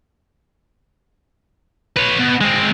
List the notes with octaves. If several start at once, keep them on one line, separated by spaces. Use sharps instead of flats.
B4 C#5
B2
G#3 C4